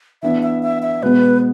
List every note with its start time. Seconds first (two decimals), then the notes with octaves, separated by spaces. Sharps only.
0.23 E3 B3 D4 E5
0.42 E5
0.63 E5
0.82 E5
1.02 B2 G#3 B3 B4